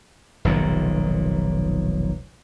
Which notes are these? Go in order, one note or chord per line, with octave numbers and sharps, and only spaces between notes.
F1 B1 A#2 D#3